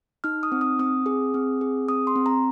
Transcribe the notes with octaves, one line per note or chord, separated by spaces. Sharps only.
D#4 F6
D#6
C4
D#6
C4 D#6
G#4
C4
G#4
C4 D#6
C6
C4
A#5